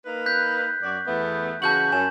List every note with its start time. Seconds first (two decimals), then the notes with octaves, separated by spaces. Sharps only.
0.06 A#3 D#4 B4
0.26 F#6 G6 B6
0.83 F#2 F#4 D5
1.07 E2 A3 B3
1.62 C#3 E3 F#4 A5 G6 F#7
1.92 F#2 G#5 C#6 E7